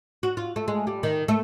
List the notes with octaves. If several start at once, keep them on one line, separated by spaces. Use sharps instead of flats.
F#4
F4
A3
G#3
G3
D#3
A3